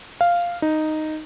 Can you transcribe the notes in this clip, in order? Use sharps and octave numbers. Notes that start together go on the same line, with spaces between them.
F5
D#4